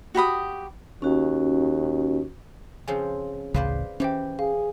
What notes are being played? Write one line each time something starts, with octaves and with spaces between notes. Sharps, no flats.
F#4 G4 B5 D#6
D#2 C#4 F#4
C#3 F3 C4 G#5
A1 D2 C#3 G#4 B4 C5 D5 F5
E3 C#4 G4 C5 G5
G#4 F5